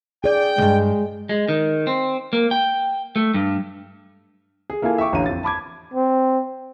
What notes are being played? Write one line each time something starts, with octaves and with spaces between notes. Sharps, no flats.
G#4 D5 G5
C2 G2 G#3
G#3
D#3
C4
A#3
G5
A3
G2
G#4
A#3 E4 F4 A4 G#5
E5 G5 C#6 D6
A1 D3 C#5 F5 A#5 D#7
F2 A6
A5 B5 D6 G#6
C4